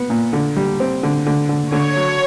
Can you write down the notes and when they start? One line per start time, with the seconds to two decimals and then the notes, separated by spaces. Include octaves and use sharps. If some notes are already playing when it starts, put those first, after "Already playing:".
Already playing: B3
0.10 A#2
0.33 D3
0.56 G3
0.80 C4
1.03 D3
1.26 D3
1.49 D3
1.72 D3 C#5
1.96 F#3